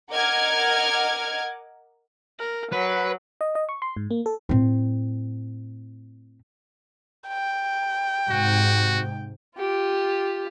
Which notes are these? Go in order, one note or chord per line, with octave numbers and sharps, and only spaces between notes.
A#4 D#5 F#5 D6 F6 G#6
A#4
F#3 B4
D#5
D#5
C#6
C6
G#2
A#3
A4
A2 C4
G5
G#2 C3 F#4
F4 G4